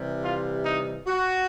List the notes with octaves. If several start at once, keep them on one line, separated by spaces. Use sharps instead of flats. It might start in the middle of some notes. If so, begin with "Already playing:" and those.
Already playing: C3 E3 G3
F4
D#4
F#4